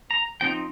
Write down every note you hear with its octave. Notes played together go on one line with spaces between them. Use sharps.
A#5
F3 C4 D#4 G5